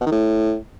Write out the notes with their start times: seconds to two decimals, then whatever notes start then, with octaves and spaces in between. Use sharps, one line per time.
0.01 B2
0.06 D#3
0.12 A2